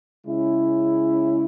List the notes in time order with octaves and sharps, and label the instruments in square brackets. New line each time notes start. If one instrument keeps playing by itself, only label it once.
[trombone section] C#3 G#3 C#4 E4